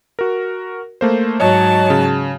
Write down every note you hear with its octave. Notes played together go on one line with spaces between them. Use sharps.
F#4 A#4
A3 A#3 C5
G#2 F#3 C#5 D#5 A5
C#3